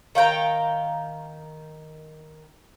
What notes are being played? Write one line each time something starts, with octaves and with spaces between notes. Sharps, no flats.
D#3 F5 G5 A#5